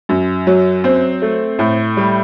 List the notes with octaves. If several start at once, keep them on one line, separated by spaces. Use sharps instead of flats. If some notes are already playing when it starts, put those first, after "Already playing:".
F#2
F#3
C4
A3
A2
G3